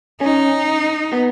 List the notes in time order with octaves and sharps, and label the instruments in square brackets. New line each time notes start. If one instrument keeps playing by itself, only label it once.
[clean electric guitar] C#4 [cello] D#4
[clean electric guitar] B3